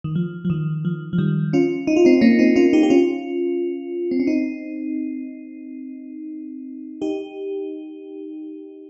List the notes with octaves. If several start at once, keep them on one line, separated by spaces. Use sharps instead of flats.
D#3
F3
F3
D#3
F3
F3
D#3 G3
C#4 F4
D#4
F4
C4 D#4
A#3 C#4
C4 D#4
C#4 F4
D#4 G4
G4
C#4 F4
C4
C#4
C4 D#4
D#4 G4